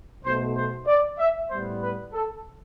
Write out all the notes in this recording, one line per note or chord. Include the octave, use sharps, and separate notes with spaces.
B1 B2 A3 C5
C5
D5
E5
A2 G3 B3 C5
B4
A4